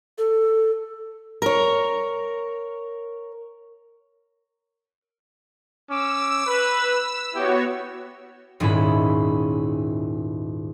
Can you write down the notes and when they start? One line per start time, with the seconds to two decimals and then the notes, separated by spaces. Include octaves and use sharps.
0.18 A4
1.42 A#4 C#5
5.90 C#4 D6 E6
6.47 B4
7.34 B3 E4 F#4 G4 C#5
8.60 D#1 G#2 D#3 C#4 E4 B5